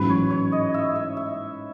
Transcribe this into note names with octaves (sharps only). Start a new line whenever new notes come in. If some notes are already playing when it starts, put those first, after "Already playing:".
Already playing: A1 G#2 F#3 C#4 B4
C#5
C#5
D#5
E5
E5
E5